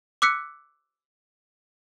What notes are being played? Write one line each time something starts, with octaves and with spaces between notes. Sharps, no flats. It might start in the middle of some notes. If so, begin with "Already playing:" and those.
D6 E6 F#6 B6 C#7